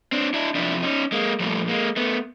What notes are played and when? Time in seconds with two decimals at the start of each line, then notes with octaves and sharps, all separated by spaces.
0.12 C4 D4
0.34 D4 E4
0.54 F2 C3 F3 D4 E4
0.83 C#4 D#4
1.12 G#3 A#3
1.40 A#2 F3 G3 A3
1.68 G#3 A#3
1.96 A3 B3